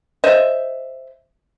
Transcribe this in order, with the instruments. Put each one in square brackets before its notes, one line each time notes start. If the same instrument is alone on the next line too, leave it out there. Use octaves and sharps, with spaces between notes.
[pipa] C5 D#5 E5